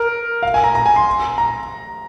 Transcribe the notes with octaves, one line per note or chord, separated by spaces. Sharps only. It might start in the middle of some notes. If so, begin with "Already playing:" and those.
Already playing: A#4
F5
G#5
A#5
A#5
G#5
C6
A#5